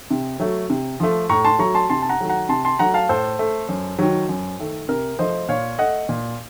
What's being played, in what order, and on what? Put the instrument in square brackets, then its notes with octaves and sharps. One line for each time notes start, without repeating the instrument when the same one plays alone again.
[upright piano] C3
F#3 A3
C3
F3 A3
A2 A#5 C#6
A5 C6
F#3 A3 A#5 C#6
A5 C6
C3 A5 C6
A5
F#5 A#5
D#3 F#3 A3
F#5 A#5
C3 A5 C6
A5 C6
F#3 A3 F#5 A#5
F5 A5
A2 A4 C5
A3
F#2
D#3 F#3
F#2
D#3 A3
C3 A#4
F3 A3 C5 D#5
A#2 C#5 F5
A3 D#5 F#5
A#2